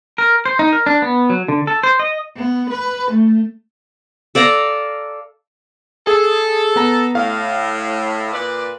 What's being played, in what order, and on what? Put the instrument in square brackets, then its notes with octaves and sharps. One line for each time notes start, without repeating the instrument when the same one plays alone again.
[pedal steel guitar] A#4
C5
D#4
A#4
D4
B3
F#3
D3
A4
C5
D#5
[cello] B3
B4
A3
[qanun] A4 D5 F5 A#5
[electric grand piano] G#4 [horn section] A4
[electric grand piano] B3 A#5
[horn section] A2 [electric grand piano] F5
[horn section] A#2 B4 D5